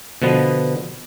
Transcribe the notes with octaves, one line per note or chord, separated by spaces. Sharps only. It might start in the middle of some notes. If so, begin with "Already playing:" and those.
B2 D3 F3 B3